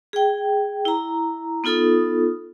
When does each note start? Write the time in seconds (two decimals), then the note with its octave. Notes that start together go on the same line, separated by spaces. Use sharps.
0.13 G#4 G5
0.85 E4 A#5
1.64 B3 D#4 F4 A4 D#6